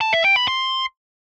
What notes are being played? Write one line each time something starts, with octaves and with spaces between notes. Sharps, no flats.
A5
E5
G5
B5
C6